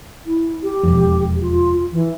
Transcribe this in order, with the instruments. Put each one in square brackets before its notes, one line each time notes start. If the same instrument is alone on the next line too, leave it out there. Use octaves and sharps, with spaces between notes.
[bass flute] E4
G4
[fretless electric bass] E1 F2
[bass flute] F4
E3